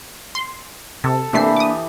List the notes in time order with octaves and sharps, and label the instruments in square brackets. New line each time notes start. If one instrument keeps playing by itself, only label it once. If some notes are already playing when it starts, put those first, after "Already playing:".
[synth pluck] C6
[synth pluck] C3 [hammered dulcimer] A4
[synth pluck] C3 A3 C7 [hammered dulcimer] E3 G4 [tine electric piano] A#3 D4 E5
[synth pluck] D6 D#6